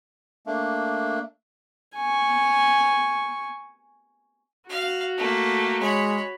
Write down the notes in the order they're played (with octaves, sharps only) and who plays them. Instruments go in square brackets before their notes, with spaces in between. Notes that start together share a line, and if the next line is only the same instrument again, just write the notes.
[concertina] A3 A#3 D4
[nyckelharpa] G#5 C#6
[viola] F#4 [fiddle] F5
[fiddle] A3 A#3
[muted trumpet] G#3 [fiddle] C#5 B5